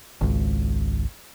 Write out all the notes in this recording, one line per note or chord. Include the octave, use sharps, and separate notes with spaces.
G#1 C#2